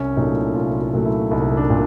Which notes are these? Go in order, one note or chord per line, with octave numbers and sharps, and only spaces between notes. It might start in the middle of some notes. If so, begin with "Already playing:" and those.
Already playing: C2 C#4
A#2 F#3 A3 D#4
E4
C2 F4
F4
A#2 F#3 A3
E4
C2 D#4
D4
A#2